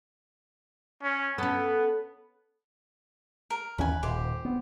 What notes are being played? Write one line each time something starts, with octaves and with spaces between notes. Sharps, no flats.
C#4
B3 C#4 A4
A#4
D#2 E3 C#4 B4 G#5
D#1 G4 C5
B3